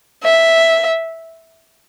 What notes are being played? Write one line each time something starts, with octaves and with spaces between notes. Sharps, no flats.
E5